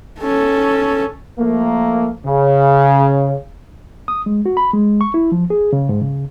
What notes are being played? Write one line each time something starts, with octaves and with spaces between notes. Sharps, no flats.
C#4 A4
F3 A3 A#3
C#3
D#6
G#3
F#4
B5
G#3
C#6
E4
F3
G#4
C#3
G#2
C#3